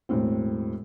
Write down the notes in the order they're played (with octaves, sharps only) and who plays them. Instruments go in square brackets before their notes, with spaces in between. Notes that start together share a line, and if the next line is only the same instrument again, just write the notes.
[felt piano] E1 A2 C4